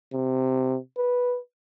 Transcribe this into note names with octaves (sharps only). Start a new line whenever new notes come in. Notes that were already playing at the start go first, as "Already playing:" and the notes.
C3
B4